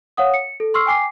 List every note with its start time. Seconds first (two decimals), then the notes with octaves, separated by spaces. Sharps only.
0.17 C#5 F5 F#5 D#6
0.34 C#7
0.60 A4
0.74 C6 C#6 E6 F6 C7
0.86 G5 G#5 D6 C7